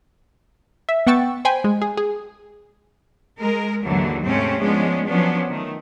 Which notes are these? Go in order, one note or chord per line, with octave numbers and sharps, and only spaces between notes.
E5
B3 F#5 G5 C#6 E6 A6
C5 G5 G#5 B5
G#3
G#4
G#4
G#3 A#4
D#2 G#2 D3 E3 F#3
G#2 C3 A3 C4 C#4
F3 G#3 B3 C#4 D4
F3 F#3 B3 C#4 D4
D#3 A3